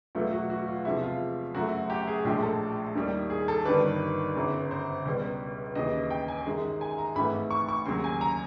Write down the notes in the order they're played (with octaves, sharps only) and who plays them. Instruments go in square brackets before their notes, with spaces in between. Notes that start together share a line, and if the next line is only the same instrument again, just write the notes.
[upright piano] E2 B2 F#3 A3 F4
F#4
F#4
F4
E2 C3 F3 G#3 E4
F4
F#2 C#3 F#3 A3 F#4
G4
G#4
A#1 A2 F3 G#3 G4
A4
D#2 D#3 G3
G#4
A4
G1 G2 D#3 G3 B4
G1 F#2 C#3
C5
C#2 B2 G3
D#2 C#3 E3 D#5
G5
G#5
F#2 D#3 G#3
G#5
A#5
G#1 G#2 E3 A3 B5
C#6
C#6
D#2 C#3 F#3 C6
G#5
A#5